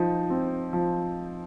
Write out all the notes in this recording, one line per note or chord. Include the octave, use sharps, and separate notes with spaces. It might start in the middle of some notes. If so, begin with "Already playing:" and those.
Already playing: F3 D#4
C4
F3